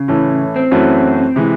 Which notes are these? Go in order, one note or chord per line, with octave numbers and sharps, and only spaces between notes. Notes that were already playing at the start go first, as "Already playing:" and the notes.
Already playing: C#3
A2 E3 A3 C#4
C4
F#2 E3 A3 C#4 F#4
C3 E3 G#3